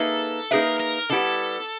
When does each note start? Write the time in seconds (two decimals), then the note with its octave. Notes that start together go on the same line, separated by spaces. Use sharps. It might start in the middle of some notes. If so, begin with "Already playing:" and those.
Already playing: A#3 D#4 G#4 A4 B4 E5
0.51 A#3 D#4 G#4 A#4 B4 E5
0.80 A#4
1.10 D3 G3 B3 E4 G4 A4